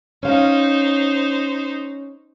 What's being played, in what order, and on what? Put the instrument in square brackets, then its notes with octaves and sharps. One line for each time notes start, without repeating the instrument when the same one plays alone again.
[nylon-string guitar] C#4 F5 [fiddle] D#4 C5